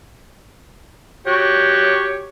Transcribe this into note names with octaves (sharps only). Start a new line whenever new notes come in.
F#4 G4 C#5